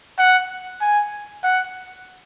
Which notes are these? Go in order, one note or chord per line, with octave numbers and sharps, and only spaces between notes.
F#5
G#5
F#5